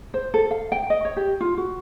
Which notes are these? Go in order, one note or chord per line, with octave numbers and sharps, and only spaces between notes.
C5
A4
F5
G5
D#5
C#5
G4
F4
F#4